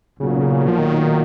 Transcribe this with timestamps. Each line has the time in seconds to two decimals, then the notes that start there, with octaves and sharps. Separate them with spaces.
0.19 B1 A#2 C#3 F#3 A#3
0.68 F3
0.78 D#3